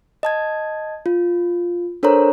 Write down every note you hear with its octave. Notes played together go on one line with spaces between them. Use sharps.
D#5 A5 G#6
F4
D4 A4 A#4 C5 C#5 A#5